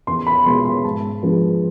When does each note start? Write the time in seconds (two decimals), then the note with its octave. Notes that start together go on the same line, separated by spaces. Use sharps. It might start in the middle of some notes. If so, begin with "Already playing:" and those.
0.07 E2 C6
0.27 B5
0.46 B2 G#3 B3 F4 C6
0.65 C6
0.84 G#2 A5
1.23 F3 G#3 B3 D4